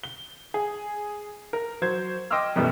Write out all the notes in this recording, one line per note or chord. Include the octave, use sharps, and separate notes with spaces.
G7
G#4
A#4
F#3 C5 G#6
D#5 G5 C6 D6 E6 F6
F#2 B2 E3 G3 A3 B3